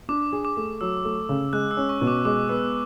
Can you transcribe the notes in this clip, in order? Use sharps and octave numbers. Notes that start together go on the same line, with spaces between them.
D4 D6
G#4
D6
A3
F#3 E6
A3
C#3
G#3 F#6
E6
C#4
C#6
B2
D6
G#3 D6
B3 E6